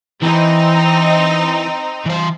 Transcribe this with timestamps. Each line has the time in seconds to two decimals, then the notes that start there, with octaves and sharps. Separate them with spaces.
0.22 E3 C4 D#4
2.06 E3 C5